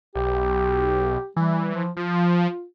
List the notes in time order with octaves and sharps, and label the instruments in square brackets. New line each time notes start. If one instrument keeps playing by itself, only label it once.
[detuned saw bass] B1 [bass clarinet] G4
[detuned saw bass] E3 [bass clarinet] G3
[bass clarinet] F3
[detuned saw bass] F3 [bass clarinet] F4